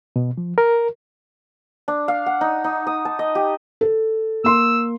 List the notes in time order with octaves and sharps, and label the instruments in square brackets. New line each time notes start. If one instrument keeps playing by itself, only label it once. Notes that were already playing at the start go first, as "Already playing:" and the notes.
[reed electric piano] B2
F3
A#4
[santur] D4
F5
F#5
D#4
D#4
D#6
A5
D#5
G4
[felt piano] A4
[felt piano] A#3 C6 [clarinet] E6